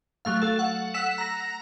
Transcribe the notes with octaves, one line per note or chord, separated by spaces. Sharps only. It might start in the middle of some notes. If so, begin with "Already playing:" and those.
F#3 A3 F5
A3 A4
F#5
F#5 E6 B6 E7
A#5 A#6